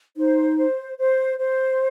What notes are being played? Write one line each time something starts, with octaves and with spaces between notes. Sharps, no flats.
D#4 C5
C5
C5
C5